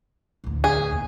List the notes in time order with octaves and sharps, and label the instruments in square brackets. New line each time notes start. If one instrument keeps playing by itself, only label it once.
[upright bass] A1 D2
[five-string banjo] G#4
[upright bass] D#1 E2